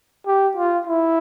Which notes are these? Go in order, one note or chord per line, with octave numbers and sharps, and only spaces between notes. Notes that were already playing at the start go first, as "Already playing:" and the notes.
G4
F4
E4